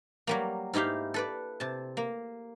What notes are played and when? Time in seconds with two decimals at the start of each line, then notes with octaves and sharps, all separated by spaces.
0.27 F#3 G3 A#3
0.73 G#2 D#4 E4 G4 F5
1.14 A4 B4 D5
1.60 C3 A5
1.97 A#3